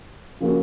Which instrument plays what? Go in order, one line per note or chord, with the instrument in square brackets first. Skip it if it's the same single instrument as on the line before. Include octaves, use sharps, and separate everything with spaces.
[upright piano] C#3 F3 A#3 C#4 F#4